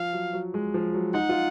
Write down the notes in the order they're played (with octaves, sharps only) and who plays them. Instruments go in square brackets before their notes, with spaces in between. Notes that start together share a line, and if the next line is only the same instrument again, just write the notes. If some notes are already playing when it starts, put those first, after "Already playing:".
Already playing: [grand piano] F3 [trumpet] F5
[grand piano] F#3
F#3
G#3
F3
F#3
[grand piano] D#4 [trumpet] F#5
[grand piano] F4